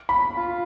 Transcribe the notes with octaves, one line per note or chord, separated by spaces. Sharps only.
B5
F4